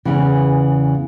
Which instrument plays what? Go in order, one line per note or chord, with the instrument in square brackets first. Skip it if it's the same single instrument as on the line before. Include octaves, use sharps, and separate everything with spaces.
[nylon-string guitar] E2 C#3 E3